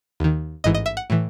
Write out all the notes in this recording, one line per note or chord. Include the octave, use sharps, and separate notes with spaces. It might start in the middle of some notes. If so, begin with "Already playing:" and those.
D#2 D#3
A1 G#2 E3 D#5
D#5
E5
F#5
A2 E3